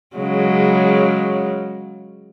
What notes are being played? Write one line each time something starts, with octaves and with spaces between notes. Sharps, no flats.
C#3 F#3 G#3